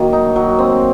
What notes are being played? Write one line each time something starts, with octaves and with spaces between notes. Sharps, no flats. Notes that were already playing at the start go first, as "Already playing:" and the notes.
Already playing: D#3 F#3 A#3
D#4
F#3
C4